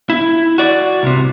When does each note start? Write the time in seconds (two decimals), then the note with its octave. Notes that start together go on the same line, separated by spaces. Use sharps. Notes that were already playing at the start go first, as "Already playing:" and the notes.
0.10 E4
0.58 F#4 D5
1.03 C2 C3